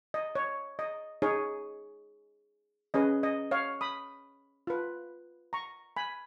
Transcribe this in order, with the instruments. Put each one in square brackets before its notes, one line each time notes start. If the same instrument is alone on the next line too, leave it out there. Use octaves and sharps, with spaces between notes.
[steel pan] D#5
C#5
D#5
D#4 G#4 C#5
C#4 G#4 B4 D#5
D#5
C#5 F5
B5 D#6
F4 B4
A#5 C#6
G#5 B5